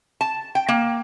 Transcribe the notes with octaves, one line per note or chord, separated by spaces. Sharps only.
A5
G5
A#3